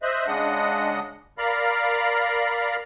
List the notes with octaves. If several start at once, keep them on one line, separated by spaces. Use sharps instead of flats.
C5 D#5 E5 F#6
C#3 G#3 D4 D#5 F#5
A#4 D5 F5 A#5 B5